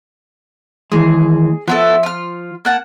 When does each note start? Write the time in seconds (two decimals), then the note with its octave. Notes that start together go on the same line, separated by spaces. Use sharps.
0.92 D#2 E3 G#3 G#4
1.68 F3 B3 E4 A4
2.03 F4 F6
2.65 A#3 F#5 A5